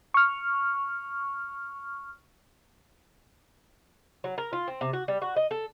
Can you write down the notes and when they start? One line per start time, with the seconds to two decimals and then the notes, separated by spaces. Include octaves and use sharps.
0.14 C#6 F6
4.24 F#3
4.38 A#4
4.53 F4
4.68 C4
4.81 C3
4.93 F#4
5.08 G3
5.22 F#4
5.36 D#5
5.51 A4